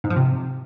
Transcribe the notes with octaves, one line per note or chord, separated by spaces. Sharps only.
G#2
F3
C3